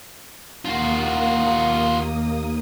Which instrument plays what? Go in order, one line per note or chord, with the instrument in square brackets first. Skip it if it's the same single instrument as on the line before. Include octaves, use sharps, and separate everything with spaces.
[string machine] D#2 A#3 D#6 [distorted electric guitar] F4 F#4